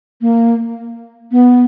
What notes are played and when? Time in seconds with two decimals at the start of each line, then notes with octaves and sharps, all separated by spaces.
0.21 A#3
1.31 B3